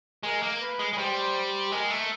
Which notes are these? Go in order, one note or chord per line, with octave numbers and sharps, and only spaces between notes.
G#3 A#4
A#3
B4
G#3
G#3
G3 C5
G#3 A#4
A3